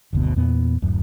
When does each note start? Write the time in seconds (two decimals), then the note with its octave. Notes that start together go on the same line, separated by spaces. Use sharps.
0.13 F#1 D2 B2
0.36 E2 A#2 B3
0.82 D1 F#2